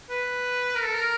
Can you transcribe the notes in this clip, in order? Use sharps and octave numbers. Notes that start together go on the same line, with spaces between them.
B4
A#4
A4
A#4